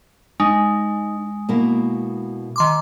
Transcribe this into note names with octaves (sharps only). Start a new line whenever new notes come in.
G#3 D#4
B2 A#3 E4
D#3 C6 D6